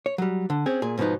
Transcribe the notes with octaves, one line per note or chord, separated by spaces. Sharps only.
C#5
F#3 G3
D3
C4 C#4 G#4
A#2 G#4
G#2 B2 F3 B3 D#4